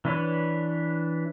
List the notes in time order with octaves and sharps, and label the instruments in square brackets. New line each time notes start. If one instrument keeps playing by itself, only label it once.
[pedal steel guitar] E3 D4 B4 C#5